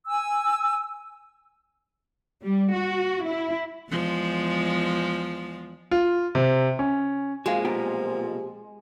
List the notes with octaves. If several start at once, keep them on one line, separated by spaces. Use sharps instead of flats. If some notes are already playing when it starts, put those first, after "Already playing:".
G#5 E6
G3
F#4
E4
E2 F3 G#3
F4
C3
C#4
A#2 F3 G#3 C4 F#4 G#4 F5
B1 G#2 B2 G4 A#4